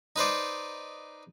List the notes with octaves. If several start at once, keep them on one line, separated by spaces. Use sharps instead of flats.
D#4 B4 C5 D5